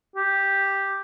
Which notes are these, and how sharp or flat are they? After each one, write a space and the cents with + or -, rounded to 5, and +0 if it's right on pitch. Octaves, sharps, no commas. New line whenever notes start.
G4 +0